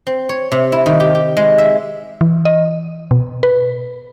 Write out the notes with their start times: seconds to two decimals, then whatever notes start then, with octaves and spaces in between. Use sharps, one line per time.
0.07 C4
0.29 C#5
0.52 C3
0.72 E4
0.86 D#3
1.00 G4
1.15 G4
1.37 G#3
1.58 E5
2.21 E3
2.45 D#5
3.11 B2
3.43 B4